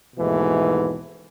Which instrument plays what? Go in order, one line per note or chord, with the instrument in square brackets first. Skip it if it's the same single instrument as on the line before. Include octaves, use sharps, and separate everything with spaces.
[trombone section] D#2 G#2 B2 E3 A3